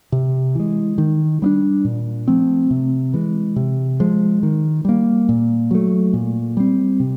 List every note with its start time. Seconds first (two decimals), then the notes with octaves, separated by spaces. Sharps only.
0.12 C3
0.55 E3 G#3
0.98 D#3
1.42 G3 B3 D4
1.85 A#2
2.28 F3 A3 C4
2.71 C3
3.14 E3 G#3
3.56 C3
4.00 F3 G#3
4.43 D#3
4.85 G3 A#3
5.29 A#2
5.71 F#3 A3
6.14 A#2
6.57 G3 C4
7.00 C3